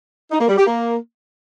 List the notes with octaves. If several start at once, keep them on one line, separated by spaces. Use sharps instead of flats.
D#4
A#3
G3
G4
A#3